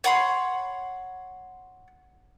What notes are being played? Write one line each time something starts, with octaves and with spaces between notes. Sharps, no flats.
C#5 F#5 B5 C6